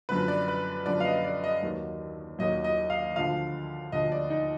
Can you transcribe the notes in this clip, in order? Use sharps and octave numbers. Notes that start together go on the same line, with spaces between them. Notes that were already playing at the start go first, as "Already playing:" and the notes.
F#2 D3 F3 B4
D5
B4
F#2 D3 F3 D5
F5
D#5
D5
D#5
D#2 D#3 F#3
D#2 D#3 F#3 D#5
D#5
F5
D2 D3 F3 F5
D2 D3 F3 D#5
D5
D#4